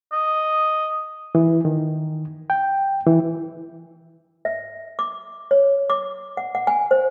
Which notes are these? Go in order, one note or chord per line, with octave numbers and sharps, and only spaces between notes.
D#5
E3
D#3
G5
E3
E5
D6
C#5
D6
F#5
F#5
G#5
C5